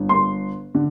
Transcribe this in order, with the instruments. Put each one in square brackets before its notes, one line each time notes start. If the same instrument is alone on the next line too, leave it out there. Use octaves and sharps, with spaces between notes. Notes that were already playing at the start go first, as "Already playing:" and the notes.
Already playing: [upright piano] G1
C6
D3